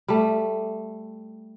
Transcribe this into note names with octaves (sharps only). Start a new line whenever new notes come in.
G3 A3